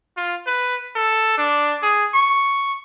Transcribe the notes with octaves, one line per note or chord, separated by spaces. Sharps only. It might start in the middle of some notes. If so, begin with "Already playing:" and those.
F4
B4
A4
D4
G#4
C#6